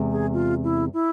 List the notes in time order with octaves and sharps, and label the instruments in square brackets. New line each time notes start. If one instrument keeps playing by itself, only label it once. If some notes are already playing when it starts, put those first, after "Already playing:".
Already playing: [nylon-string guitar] E2 C3 G#3
[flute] G#4
F4
E4
E4